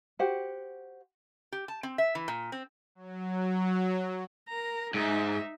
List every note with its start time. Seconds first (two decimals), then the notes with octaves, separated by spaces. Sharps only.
0.19 F#4 G4 C5 F#5
1.52 G4
1.68 A5
1.83 C4
1.98 E5
2.15 E3
2.28 A#2
2.52 C4
2.95 F#3
4.48 A#4 A#5
4.94 G#2 D#4 E5